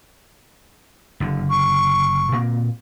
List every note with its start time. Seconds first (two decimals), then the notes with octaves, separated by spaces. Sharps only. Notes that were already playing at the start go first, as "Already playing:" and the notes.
1.20 F#1 D3
1.50 C#6
2.32 A#2 A#3 C4